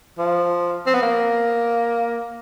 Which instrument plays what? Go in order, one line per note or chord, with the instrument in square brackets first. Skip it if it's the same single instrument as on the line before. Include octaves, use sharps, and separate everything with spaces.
[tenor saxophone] F3
C4
B3
A#3